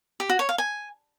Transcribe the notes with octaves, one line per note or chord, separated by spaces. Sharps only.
G4
F#4
C#5
F5
G#5